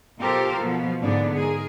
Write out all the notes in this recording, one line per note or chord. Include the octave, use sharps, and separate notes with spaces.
B2 F4 G4 A4 A#4 C5
B2 F3 B3
G#2 D3 B3 D4
G#2 G#4 A#4